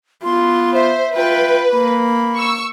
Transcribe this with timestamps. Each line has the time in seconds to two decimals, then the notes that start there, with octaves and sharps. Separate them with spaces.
0.24 B3 F4 C6
0.75 C5 E5
1.16 F4 B4 G5
1.73 A#3 B5
2.37 C#6 E6